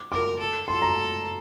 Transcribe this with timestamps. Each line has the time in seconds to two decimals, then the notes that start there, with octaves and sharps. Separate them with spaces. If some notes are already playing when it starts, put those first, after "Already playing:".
Already playing: D6
0.12 A#4 D6
0.40 A4
0.67 A4 C6
0.82 A#5